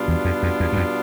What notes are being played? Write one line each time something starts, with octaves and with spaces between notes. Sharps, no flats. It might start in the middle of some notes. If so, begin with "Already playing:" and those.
Already playing: B2 G3 B3 D4 F4
E2
F2
F2
E2
G2
F2